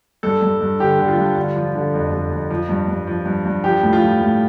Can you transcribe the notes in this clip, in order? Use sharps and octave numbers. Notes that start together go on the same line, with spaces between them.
G2 A4
G2
G2
D3 G4
D3
F4
G2
D3
F3
D3
F2
F2
F2
F3
G2
G2
F3
G2
G2
F3 G4
A2
F4
F3
A2